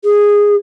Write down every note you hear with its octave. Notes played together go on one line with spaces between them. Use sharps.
G#4